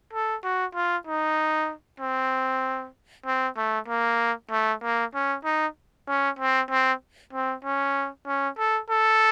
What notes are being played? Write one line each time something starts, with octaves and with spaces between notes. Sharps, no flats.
A4
F#4
F4
D#4
C4
C4
A3
A#3
A3
A#3
C#4
D#4
C#4
C4
C4
C4
C#4
C#4
A4
A4